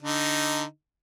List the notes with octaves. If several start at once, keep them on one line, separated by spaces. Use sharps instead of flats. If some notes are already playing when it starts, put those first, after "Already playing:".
D3 D#4